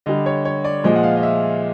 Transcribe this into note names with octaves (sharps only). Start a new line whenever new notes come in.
D3 G3 D#5
C#5
C#5
D5
A#2 F3 G#3 D#5
F#5
F5
D#5
E5